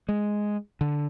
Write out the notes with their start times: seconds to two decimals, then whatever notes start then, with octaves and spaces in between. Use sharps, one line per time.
0.09 G#3
0.81 D3